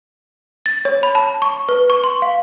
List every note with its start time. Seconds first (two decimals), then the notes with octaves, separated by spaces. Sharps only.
0.66 A6
0.85 C#5
1.03 B5
1.15 A5
1.42 C#6
1.69 B4
1.90 C#6
2.04 C6
2.22 F5